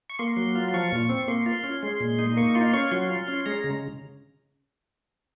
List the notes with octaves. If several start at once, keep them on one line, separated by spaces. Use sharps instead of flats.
C#6
A#3 C6
F#3
F4
F3 C#6
A#2
C4
A#3 C6
F4
C#4
G#3
A#2
D#4
A#3 C#6
F4 C6
C#4 C#6
F#3 C6
F4
C#4
G#3 A#5
C#3